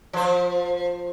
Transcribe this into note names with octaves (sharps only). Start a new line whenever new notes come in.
F3 C5